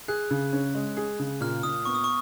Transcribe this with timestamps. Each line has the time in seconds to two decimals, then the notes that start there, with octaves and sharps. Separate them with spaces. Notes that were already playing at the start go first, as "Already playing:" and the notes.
0.08 G#4 F#6
0.31 C#3
0.53 C#4
0.75 G#3
0.97 G#4
1.19 C#3
1.41 A#2 F6
1.63 A#2 D#6
1.85 B3 C#6
1.95 D#6
2.04 C#6